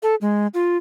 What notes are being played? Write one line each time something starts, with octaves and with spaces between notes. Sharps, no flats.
A4
G#3
F4